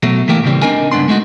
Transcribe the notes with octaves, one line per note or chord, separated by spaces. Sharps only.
B2 F#3 A3
E3 A3 A#3 G4
A2 C#3 E3 G3 C4
C4 D4 D#4 A#4 G#5
C#2 G2 B3 D4 C6
G#3 A3 D#4 F#4